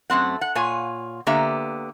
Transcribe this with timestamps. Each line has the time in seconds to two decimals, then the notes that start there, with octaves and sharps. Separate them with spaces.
0.10 F#2 A3 C4 F#5
0.41 F#5
0.55 A#2 F4 C#5 G#5
1.27 D3 A#3 B3 G4 E5 A#5